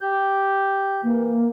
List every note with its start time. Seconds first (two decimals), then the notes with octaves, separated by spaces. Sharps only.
0.01 G4 G6
1.03 E3 A#3